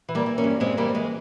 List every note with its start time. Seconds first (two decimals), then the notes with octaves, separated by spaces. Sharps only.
0.09 E3
0.15 G3 A#3
0.26 E3
0.38 A#3 C#4
0.44 G2
0.60 G2 G#3 C4
0.77 E3 G3 A#3
0.94 E3 G#3